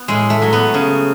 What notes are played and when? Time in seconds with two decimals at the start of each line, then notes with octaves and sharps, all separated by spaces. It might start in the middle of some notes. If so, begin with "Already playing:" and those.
Already playing: B3
0.08 A2 G#3
0.30 A3
0.42 F#3
0.53 B3
0.74 C#3